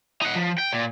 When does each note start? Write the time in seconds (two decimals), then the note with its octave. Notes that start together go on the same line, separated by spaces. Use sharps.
0.22 D#4 F#5
0.35 F3
0.58 G5
0.73 A#2